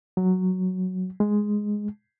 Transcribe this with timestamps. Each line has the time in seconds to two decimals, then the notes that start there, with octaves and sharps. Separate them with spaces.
0.17 F#3
1.20 G#3